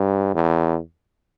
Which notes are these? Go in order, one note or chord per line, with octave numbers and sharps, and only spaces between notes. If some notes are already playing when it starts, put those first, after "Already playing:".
Already playing: G2
E2